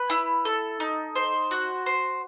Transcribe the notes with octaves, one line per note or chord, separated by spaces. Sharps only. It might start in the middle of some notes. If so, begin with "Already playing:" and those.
Already playing: B4
E4
A4
D#4
C5
F#4
C5